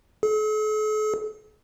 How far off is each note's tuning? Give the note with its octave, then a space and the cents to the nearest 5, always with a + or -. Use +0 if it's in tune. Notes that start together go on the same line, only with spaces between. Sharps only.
A4 -45